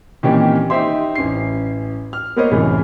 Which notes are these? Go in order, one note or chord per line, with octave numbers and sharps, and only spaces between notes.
A#2 D#3 E3 C4 C#4 G4
D#4 G4 C5 E5 C6
A1 C#4 C7
F6
A#3 B3 A#4 C5 C#5 D#5
C2 F#2 A2 E3 G#3